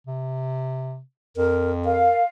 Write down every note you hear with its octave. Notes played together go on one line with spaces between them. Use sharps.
C3
F2 A#4
A#4 F5